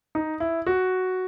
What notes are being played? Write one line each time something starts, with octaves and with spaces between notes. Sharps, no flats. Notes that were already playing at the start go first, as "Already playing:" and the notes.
D#4
E4
F#4